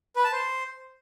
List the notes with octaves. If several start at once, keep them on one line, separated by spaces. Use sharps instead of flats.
B4
A5
C5